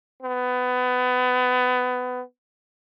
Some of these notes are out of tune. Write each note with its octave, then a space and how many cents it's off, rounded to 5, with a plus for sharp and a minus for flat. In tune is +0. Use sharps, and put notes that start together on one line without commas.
B3 +25